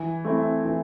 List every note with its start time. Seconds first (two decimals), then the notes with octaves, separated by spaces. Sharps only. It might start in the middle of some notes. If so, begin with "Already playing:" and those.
Already playing: E3
0.25 A3 C4 E4
0.65 E3